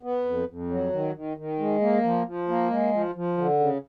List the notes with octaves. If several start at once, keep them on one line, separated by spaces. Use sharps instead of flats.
B3
F2
F2
F#3
D#3
D#3
D#3
G#3
A#3
F3
F3
A#3
G#3
F3
F3
D3
C#3